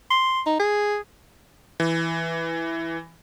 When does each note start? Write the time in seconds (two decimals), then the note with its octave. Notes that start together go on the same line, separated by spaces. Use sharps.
0.10 C6
0.46 D#4
0.60 G#4
1.80 E3